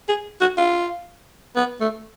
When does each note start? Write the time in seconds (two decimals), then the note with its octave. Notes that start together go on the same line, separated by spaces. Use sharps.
0.09 G#4
0.41 F#4
0.58 F4
1.56 B3
1.80 A3